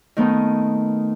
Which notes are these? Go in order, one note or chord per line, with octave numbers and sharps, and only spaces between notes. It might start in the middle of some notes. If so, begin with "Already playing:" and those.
D#3 A3 B3 D#4